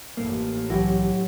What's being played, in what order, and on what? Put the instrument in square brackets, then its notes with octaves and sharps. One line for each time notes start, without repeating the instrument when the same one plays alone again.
[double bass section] A1 A2 [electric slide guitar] A#3
[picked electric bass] C2 E3 [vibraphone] F#3 C#5 [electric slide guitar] E4 G4